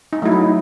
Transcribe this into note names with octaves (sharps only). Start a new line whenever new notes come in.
D#4
F#3 A3 E4
D#4